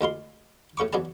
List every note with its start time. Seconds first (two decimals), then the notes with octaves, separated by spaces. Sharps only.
0.01 D2 G#3 F4 C6
0.77 A2 C#3 C#6 D6
0.93 E2 F#3 D4 G#4 A5